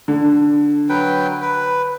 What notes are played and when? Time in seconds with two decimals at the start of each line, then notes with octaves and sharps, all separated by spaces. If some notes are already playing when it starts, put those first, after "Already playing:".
0.08 D3
0.89 F#3 B4 G5
1.42 B4